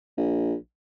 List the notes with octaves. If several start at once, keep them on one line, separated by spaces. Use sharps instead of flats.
A#1